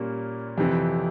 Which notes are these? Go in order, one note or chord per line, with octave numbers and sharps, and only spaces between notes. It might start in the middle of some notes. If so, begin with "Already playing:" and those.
Already playing: A#2 G3 A#3 C#4
F2 C3 E3